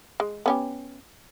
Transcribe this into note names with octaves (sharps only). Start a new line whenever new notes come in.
G#3
B3 C#4 G4